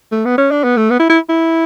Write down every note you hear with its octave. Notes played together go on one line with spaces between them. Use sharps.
A3
B3
C#4
D4
B3
A3
B3
E4
E4
E4